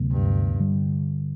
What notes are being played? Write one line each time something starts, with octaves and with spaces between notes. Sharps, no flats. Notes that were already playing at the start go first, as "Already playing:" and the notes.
Already playing: D2 C3 F#3 B3
G2
D3 G3